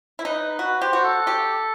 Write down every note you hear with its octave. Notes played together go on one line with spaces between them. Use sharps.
E4
D#4 B4
F#4 B4
G4 C5
F#4
A4
G4